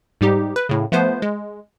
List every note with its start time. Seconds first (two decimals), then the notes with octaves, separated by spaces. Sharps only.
0.21 G#2 G3 D#4 G4
0.56 B4
0.69 A2 C#3
0.92 F3 A3 B3 B4 C5
1.22 G#3